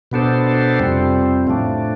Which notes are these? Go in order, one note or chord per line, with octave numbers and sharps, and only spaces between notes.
B2 B3 D4 A4 C5
F2 C3 G3 C4
A2 F3 A3 D4